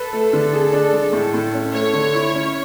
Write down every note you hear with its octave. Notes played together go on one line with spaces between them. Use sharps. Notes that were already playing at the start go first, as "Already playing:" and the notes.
Already playing: A4 B4
A3
D3
G#4
D4
G#3
A2
A2
C#4
A3 C#5
D3
E4
C#4